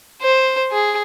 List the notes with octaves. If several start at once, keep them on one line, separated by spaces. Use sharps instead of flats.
C5
G#4